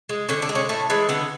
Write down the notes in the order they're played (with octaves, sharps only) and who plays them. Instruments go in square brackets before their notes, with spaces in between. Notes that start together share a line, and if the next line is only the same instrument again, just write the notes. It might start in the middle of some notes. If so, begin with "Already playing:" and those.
[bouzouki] G#3
D3 C#4
D4
G#3
C#4
A2 A3
E3 G#3
D3 B3